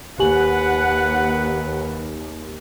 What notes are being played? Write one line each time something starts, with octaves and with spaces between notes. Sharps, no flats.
D#2 G4 B4 F#5 G#5 F#7